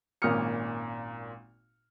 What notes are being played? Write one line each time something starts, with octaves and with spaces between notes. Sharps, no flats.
G#1 A#2 C#4 D#6 F6 C#7